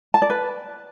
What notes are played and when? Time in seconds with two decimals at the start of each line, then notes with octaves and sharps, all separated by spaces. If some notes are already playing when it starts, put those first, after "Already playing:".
0.14 A5
0.22 D5
0.30 B4